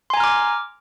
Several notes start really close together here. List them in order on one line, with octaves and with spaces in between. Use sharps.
C6 G#5 A#5 F6 D6